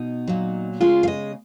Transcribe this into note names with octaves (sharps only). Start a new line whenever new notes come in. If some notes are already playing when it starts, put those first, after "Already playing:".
Already playing: B2 D#4
A#2 F#3
C#3 G#3 F4
F5
D#5